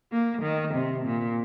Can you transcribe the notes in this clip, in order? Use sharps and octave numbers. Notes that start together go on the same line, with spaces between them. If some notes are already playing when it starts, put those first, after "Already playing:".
A#3
D#3
C3
A#2